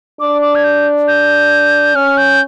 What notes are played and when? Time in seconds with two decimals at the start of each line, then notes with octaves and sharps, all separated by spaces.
0.20 D4 D6
0.42 D6
0.55 G#6
0.64 G6
1.08 G6
1.96 C#4 F6
2.17 G6